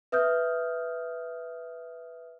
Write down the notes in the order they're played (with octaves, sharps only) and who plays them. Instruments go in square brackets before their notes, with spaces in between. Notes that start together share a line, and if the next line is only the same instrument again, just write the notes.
[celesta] B4 E5 D#6 F6 G6